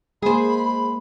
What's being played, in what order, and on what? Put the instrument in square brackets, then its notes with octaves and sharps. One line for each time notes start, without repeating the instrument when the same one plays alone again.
[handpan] G#3 A#3 [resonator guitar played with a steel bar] G#4 C5 [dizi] B5